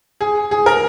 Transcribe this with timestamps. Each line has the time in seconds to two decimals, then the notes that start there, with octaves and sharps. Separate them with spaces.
0.21 G#4
0.51 G#4
0.66 A#4